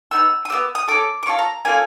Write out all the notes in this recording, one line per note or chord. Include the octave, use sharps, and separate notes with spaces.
B3 D#4 E6
D#6
B3 D#4 G4 E6
D#6
C#4 F4 A4 D6
D6
C#4 F4 A4 C#6
A#5
A#3 C#4 F4 A4 G#5